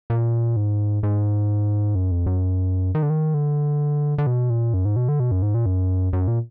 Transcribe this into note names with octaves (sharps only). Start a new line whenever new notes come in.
A#2
G#2
G#2
F#2
F2
F#2
D#3
D3
D#3
D3
D3
B2
A#2
F#2
G#2
B2
D3
B2
F#2
G#2
A#2
F#2
F#2
A#2